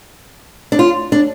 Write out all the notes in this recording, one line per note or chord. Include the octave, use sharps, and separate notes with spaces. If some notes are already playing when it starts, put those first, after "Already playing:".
D4
F4
D4